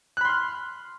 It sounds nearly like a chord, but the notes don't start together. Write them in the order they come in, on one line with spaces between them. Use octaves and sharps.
F#6 B5 C6 F6